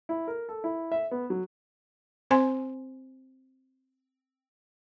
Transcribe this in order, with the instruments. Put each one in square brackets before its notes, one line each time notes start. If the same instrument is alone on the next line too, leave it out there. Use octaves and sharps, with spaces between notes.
[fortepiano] E4
A#4
A4
E4
E5
B3
F#3
[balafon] C4 C5 G#5 C6